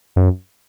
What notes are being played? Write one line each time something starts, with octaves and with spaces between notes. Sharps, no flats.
F#2